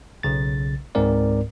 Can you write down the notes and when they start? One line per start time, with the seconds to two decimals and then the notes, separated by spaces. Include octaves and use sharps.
0.23 B1 C#3 A6
0.95 C#2 G#2 G#3 C4 A#4 D5